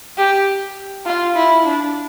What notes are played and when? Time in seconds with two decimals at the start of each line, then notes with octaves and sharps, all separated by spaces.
0.18 G4
1.06 F4
1.36 E4
1.66 D4